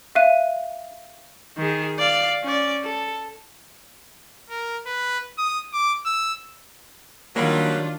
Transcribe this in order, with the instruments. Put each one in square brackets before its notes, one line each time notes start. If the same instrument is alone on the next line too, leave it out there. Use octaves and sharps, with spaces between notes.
[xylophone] E5 F5 F#6 D#7
[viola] D#3 G#4
D5 F5
C#4 D5
A4
[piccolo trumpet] A#4
B4
D#6
D6
E6
[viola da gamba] D#3 [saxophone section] F#3 G3 [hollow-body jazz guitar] A#3 [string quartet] D4 F4